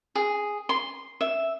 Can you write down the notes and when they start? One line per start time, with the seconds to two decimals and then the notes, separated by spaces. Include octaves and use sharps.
0.15 G#4
0.69 C6
1.21 E5